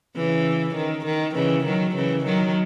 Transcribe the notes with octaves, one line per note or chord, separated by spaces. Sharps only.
C#3 E3
D#3
D#3
C#3 E3
D#3 F#3
C#3 E3
D#3 F#3